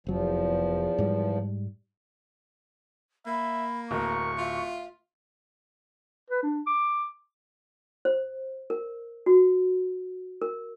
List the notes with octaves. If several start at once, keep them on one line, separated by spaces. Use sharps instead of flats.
F1 E2 F3 F#3
G#2 G3
A#3 E5 B5
D1 A#4 C#6
F4 E5
B4
D4
D6
C5
A#4
F#4
A#4